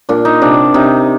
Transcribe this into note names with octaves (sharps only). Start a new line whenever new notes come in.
A#2 D4
D#4
C3 D4
C3 D#4